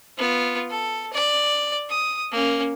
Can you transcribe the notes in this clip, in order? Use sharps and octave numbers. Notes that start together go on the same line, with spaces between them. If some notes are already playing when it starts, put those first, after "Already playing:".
B3 F4
A4
D5
D#6
A#3 C#4